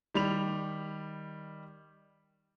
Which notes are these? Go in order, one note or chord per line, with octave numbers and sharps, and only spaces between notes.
D#3 G3 B5 F7